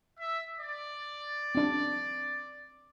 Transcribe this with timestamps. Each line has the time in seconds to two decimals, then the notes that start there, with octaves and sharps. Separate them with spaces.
0.19 E5
0.60 D5
1.55 C4 D4